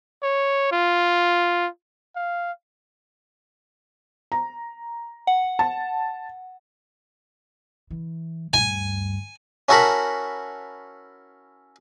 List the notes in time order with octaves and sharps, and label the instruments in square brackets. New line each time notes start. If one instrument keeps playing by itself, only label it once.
[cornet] C#5
F4
F5
[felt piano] A#5
[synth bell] F#5
[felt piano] A5
[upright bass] E3
[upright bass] D2 G2 [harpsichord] G#5
[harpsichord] C#4 E4 F#4 A4 A#4 B5